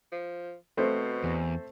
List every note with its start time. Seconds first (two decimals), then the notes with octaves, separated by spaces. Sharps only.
0.12 F3
0.77 B2 A3 C4 C5
1.24 E2